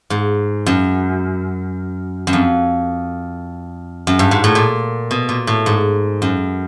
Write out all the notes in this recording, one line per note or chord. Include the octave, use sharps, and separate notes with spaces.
G#2
F#2
F#2
F2
F#2
G2
G#2
A2
A#2
B2
A#2
A2
G#2
F#2